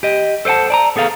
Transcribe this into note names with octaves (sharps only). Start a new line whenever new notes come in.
G4 D#5
A4 C5 D5 F#5 A5
D5 A5 A#5
B3 G#4 A4 F5